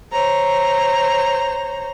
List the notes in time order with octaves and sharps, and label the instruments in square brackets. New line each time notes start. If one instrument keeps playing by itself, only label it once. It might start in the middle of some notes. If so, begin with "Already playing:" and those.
[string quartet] C5 C#5 A#5